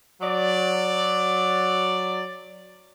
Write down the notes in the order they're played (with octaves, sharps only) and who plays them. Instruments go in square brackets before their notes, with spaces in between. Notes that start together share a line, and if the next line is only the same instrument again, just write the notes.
[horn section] F#3 D5